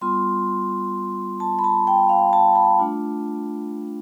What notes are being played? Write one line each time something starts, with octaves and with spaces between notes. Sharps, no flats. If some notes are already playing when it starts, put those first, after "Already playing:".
G3 B3 F4 C6
A5
B5
A5
G5
F5
A5
B5
A3 D4 F4